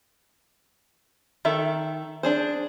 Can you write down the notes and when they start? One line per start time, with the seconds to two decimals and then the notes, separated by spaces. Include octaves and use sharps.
1.45 D#3 A4 E5
2.23 D4 G#4 C5